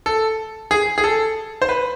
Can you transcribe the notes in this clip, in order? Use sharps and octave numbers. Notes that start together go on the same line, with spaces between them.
A4
G#4
G#4
A4
C5
B4